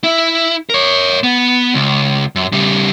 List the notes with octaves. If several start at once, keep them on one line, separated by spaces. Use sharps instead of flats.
E4
A#4 C#5
B3
C#2
F#2
C#3 G3